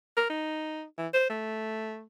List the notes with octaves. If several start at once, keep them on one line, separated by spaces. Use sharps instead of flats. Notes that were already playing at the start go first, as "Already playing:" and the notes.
A#4
D#4
E3
C5
A3